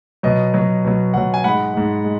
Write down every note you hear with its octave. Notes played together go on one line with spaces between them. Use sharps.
B2 F#3 D#5
B2 F#3
B2 F#3
B2 F#3 F#5
G#5
G#2 G#3 F#5 B5
G#2 G#3
G#3